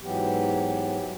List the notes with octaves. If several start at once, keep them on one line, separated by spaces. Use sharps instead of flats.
G#2 E3 F#3 B3 G4